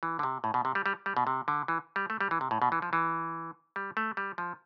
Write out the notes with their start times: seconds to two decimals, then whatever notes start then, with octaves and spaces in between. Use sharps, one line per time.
0.03 E3
0.19 D3
0.23 C3
0.44 A2
0.54 B2
0.65 C3
0.75 G3
0.86 G3
1.06 G3
1.17 B2
1.27 C3
1.48 D3
1.68 E3
1.96 G3
2.10 A3
2.21 G3
2.31 E3
2.41 C3
2.51 A2
2.62 B2
2.72 E3
2.82 F3
2.93 E3
3.76 G3
3.97 A3
4.17 G3
4.38 F3